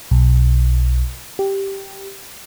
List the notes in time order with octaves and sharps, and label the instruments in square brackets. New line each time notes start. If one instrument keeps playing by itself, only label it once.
[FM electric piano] B1
G4